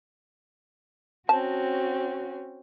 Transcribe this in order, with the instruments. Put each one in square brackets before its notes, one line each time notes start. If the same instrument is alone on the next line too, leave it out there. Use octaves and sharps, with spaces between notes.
[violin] C4 C#4 [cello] F#4 [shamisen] A5